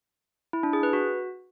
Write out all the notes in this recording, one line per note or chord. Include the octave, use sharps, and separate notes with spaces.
E4
D4
G#4
B4
F#4